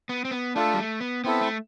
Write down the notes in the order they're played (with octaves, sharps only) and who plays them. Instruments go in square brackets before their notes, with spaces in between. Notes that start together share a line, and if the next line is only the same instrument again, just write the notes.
[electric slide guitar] B3
C4
B3
[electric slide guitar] A3 [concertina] D4 F4 A4
[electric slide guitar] G3
A3
B3
[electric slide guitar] B3 [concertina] C4 E4 A4
[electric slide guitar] A3